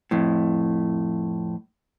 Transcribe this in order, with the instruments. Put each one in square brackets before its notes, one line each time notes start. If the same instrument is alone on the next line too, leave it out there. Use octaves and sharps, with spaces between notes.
[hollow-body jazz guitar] F2 A2